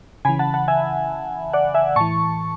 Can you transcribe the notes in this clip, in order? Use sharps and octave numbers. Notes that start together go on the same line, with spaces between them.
C#3 E3 G#5 B5
F#5 A5
F#5 A5
E5 G#5
D5 F#5
E5 G#5
A2 E3 A5 C#6